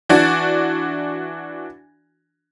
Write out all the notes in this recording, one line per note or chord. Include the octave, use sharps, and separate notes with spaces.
E3 D4 F#4 A6